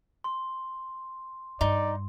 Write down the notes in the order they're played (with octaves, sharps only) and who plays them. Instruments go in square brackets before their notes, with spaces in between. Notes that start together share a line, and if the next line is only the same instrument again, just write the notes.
[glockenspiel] C6
[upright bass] G2 [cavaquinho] D#4 [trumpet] D5